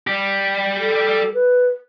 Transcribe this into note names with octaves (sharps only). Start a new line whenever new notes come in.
G3 G4
A4
B4